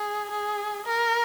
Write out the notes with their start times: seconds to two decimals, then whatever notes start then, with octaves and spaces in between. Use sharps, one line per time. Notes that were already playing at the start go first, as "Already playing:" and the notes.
Already playing: G#4
0.30 G#4
0.86 A#4